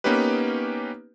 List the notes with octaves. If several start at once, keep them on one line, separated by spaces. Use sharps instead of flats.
A#3 B3 C#4 D#4 G4 B4